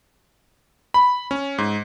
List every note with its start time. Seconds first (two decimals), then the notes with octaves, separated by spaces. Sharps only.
0.94 B5
1.31 C#4
1.58 G#2